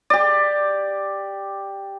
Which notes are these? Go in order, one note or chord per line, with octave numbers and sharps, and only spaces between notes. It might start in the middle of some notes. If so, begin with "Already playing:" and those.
G4 D5